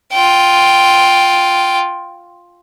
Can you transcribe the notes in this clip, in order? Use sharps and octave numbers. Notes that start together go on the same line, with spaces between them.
F4 G5